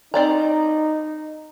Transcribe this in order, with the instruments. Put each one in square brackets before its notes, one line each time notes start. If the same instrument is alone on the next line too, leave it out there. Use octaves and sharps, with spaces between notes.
[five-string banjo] C4 D5 A#5 [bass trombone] D#4